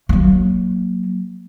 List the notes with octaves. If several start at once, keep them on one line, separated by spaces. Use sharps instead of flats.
F#3 A#3